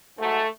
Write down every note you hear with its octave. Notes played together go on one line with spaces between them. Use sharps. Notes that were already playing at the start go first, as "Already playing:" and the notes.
G#2 F#3 A3